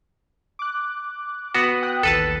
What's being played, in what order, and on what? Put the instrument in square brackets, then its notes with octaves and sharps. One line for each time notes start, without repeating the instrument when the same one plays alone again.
[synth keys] D6 F#6
[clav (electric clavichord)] B3 F#4 [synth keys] D#7
[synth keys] G5 D#6 F#6
[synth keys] A1 D#2 [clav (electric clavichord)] A4 B4 A5